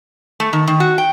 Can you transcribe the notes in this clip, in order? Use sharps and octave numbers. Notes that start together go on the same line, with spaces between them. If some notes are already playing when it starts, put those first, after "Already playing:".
A3
D#3
D#3
F#4
G5